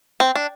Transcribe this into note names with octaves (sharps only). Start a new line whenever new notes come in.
C4
D4